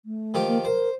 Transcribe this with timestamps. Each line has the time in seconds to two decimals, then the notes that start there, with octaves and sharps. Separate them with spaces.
0.05 A3
0.34 D#3 F3 G4
0.48 A#3
0.65 A#4 C5